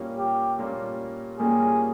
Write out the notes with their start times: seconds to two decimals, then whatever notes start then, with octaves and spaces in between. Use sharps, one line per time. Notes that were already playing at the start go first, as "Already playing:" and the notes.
Already playing: A#2 G3 A#3 C#4
0.18 G4
0.59 A#2 G3 A#3 C#4
1.39 A#2 G3 A#3 C#4 G#4